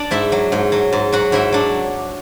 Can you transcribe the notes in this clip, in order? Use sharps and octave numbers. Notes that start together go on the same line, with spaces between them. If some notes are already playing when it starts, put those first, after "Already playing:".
Already playing: D4 D5
G#2 E4 E5
F#3
G#2
F#3
G#2
F#3 F#4 F#5
G#2 E4 E5
F#3 D4